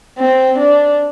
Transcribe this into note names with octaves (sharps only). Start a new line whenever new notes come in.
C4
D4